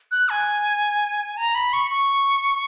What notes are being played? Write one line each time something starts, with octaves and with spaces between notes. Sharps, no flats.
F#6
G#5
A#5
B5
C#6
C#6